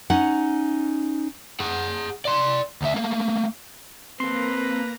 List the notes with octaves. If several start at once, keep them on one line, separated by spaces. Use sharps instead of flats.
C#4 D#4 F#5
G#4 F#5
D5 C6
D2 E5
A3 A#3
A#3 C4 A4 B4 A#5 C6